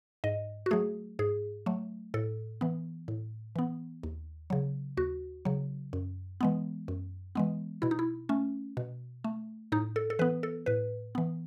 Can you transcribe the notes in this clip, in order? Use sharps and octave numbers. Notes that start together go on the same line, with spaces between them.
G#2 D#5
F#4
F#3 A3 G#4
G#2 G#4
F#3 A3
A2 A4
E3 B3
A2
E3 B3
D#2
C#3 F#3
D#2 F#4
C#3 F#3
F#2
E3 G#3 B3
F#2
E3 G#3 B3
B2 E4
D#4
E4
A3 C#4
B2
A3
A2 D#4
A4
A4
E3 B3 B4
A4
A2 B4
E3 B3